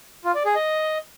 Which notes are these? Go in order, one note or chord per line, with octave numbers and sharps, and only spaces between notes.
F4
D5
G#4
D#5